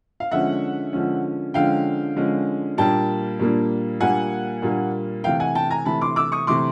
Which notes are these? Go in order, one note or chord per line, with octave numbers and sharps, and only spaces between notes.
F5
D3 F3 G#3 C#4 E5 F#5
D3 F3 G#3 C#4
D3 F3 G#3 C#4 F5 G5
D3 F3 G#3 C#4
A#2 G3 A#3 D4 G5 A5
A#2 G3 A#3 D4
A#2 G3 A#3 D4 F#5 G#5
A#2 G3 A#3 D4
C3 E3 A3 F5 G5
F#5 G#5
G5 A5
G#5 A#5
C3 E3 A3 A5 B5
C6 D6
D6 E6
C#6 D#6
C3 E3 A3 C6 D6